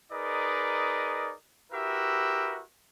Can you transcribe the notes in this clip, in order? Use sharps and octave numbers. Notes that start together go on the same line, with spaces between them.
D#4 G#4 A#4 B4 D5 D#5
E4 F#4 G4 A#4 B4 E5